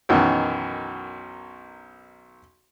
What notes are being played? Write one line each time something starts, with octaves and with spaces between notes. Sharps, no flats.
B1 F#2 D#3 E3